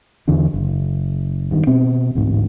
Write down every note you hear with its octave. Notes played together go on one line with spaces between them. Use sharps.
E2 D3 E3 D4
F#1
G2 D#3
B2 C4
A1 D2 G#2